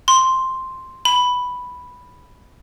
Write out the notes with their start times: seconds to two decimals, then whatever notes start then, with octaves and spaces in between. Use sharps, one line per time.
0.08 C6
1.05 B5